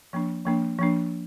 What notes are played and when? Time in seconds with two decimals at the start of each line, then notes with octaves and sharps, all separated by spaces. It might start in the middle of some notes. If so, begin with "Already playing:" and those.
0.13 F3 A#3 D4
0.45 F3 A#3 D4
0.78 F3 A#3 D4